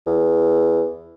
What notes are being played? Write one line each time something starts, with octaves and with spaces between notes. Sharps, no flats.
E2